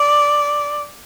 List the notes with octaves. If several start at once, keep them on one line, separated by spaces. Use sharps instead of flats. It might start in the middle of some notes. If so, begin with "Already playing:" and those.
Already playing: D5